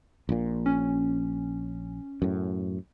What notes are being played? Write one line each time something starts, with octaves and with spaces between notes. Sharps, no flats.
A#1 A#2
C#4
F#2 A2